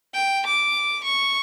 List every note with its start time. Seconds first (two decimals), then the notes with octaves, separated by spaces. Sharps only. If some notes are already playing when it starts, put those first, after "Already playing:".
0.13 G5
0.46 D6
1.04 C#6